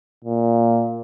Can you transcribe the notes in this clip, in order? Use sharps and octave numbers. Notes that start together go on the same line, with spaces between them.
A#2